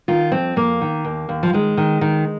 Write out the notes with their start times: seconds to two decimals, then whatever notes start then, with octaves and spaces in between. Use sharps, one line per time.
0.08 D#3 F4
0.32 F2 C4
0.56 F2 A#3
0.81 D#3
1.04 D#2
1.29 D#2
1.43 F3
1.53 D#3 G#3
1.77 D#3
2.01 D#3